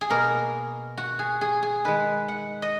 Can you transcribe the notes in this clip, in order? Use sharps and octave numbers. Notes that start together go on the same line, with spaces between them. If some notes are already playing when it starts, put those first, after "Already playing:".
G#4
B2 A#3 A#4
F#4
G#4
G#4
G#4
D#3 G#3 B4
F#5
D#5